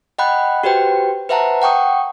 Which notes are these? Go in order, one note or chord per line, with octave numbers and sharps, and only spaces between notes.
D#5 F#5 G5 B5 F#6
F#4 G4 B4 C5 G5
B4 C5 E5 F#5 A5 A#5
F#5 G5 C#6 D#6